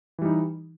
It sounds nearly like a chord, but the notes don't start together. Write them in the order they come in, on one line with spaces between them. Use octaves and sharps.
E3 G3 D#4